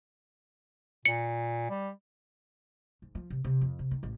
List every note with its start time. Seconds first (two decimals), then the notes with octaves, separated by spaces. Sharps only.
1.05 A#2 C#7
1.70 G3
3.02 G#2
3.15 F3
3.30 C3
3.45 C3
3.61 F2
3.79 C3
3.91 D#3
4.03 A1